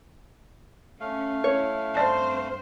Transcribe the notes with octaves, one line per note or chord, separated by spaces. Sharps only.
A3 C#4 F5
C#4 E4 C#5
G2 C4 C5 D5 A5